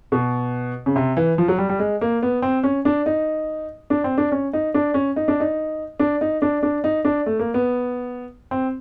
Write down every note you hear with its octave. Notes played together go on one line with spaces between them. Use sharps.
B2
C#3
C3
E3
F3
F#3
G3
G3
G#3
A#3
B3
C4
C#4
D4
D#4
D4
C4
D4
C#4
D#4
D4
C#4
D#4
D4
D#4
D4
D#4
D4
D4
D#4
D4
A3
A#3
B3
C4